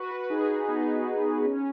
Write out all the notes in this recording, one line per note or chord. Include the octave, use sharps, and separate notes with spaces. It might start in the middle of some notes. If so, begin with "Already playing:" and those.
Already playing: F#4 B4
F#4 B4
D#4 G#4
B3 D#4
C#4